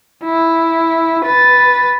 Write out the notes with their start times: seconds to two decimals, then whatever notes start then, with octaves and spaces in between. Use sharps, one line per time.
0.24 E4
1.25 B4 A6